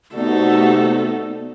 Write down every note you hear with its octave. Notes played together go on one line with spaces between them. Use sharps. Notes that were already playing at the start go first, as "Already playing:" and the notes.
C3 A3 B3 D#4 F#4 A4 D5